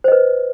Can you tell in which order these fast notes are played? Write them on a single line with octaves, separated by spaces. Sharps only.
C5 D#5 B4